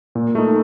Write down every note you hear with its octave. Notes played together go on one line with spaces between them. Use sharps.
A#2
A3 D#4